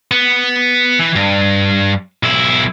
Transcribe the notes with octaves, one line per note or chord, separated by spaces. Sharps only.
B3
E3
G2
B1 E4